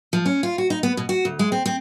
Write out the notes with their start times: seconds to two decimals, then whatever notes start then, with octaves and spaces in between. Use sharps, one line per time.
0.13 F3
0.26 C#4
0.43 F4
0.58 F#4
0.70 D#4
0.83 B3
0.97 B2
1.09 F#4
1.25 D2
1.39 G#3
1.52 C4
1.66 C4